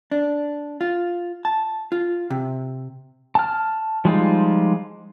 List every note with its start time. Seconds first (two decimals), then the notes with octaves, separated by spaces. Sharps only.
0.11 D4
0.81 F4
1.45 A5
1.92 F4
2.30 C3
3.35 A5 F6
4.05 F3 G3 G#3 D#4 F4